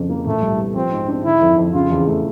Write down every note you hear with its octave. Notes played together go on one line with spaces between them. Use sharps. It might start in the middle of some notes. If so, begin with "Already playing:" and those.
Already playing: F2 C#3
A#3
A#2 A3
C2
B3
F3 C4
G#2
D4
D3 E4
F2
F2
C#3 F4
E2
A3